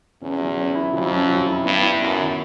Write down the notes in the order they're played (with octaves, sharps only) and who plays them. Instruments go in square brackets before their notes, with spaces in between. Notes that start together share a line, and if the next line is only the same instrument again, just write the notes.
[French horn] E2 [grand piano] C#4
[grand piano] F#3
C#4
E4
[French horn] F2 [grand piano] F#3
[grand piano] C#4
F#3
E4
[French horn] G2 [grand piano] B3
[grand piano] E4
[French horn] F#2 [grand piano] B3
[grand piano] D#3